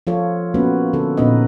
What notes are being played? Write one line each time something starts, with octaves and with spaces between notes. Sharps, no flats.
F3 F4 A4 C#5
A#3 B3 C#4 F#4 B4
D3 A4
A#2 B3 C#4 D#4 B4 D#5